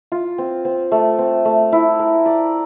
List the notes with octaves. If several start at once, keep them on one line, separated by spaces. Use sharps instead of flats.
F4
C4
C4
A3
C4
A3
E4
A#4
D5